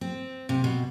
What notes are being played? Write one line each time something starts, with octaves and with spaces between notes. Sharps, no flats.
C4
C3
B2